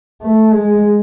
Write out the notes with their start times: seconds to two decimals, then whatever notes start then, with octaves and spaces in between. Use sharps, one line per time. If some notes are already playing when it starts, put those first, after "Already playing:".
0.21 A3
0.51 G#3